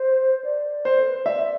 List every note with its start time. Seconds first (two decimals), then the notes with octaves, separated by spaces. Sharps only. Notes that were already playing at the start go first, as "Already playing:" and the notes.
Already playing: C5
0.35 C5
0.44 D5
0.85 C5
0.99 A4
1.08 B4
1.16 C5
1.26 D5 E5